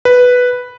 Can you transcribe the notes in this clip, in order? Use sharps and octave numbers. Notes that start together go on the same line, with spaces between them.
B4